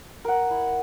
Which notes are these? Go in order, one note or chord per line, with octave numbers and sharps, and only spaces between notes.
A#4 F#5
E4